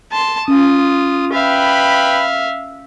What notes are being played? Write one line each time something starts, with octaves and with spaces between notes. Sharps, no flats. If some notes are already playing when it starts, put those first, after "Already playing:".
A5 C6
C#4 F4 D#6
B4 E5 F5 G5 B5